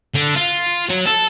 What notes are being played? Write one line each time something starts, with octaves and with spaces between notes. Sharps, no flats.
D3
F4
F#3
A4